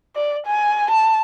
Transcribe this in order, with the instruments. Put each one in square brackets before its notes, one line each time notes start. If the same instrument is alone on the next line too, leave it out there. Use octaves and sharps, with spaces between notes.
[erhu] D5
G#5
A5